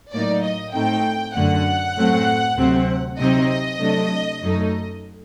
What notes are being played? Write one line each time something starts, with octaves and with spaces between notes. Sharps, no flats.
A2 F#3 A#3 D#4 D5
D#5
A2 A3 C4 D#4 G5
F#2 D3 A3 F#5
A2 F#3 A3 C4
D2 C3 F#3 C4
C3 F#3 C4 D#4 D#5
C3 F#3 A3 D4
F#2 F#3 A3 D#4